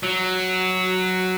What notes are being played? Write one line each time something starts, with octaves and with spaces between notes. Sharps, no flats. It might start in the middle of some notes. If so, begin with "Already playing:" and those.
F#3